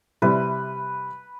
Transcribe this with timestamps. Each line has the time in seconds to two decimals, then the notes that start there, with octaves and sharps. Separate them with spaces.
0.22 C3 G3 E4 B4